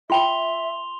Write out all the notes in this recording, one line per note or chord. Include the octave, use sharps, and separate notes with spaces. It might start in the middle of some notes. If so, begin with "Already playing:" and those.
F4 E5 G5 B5 C6 F7 G7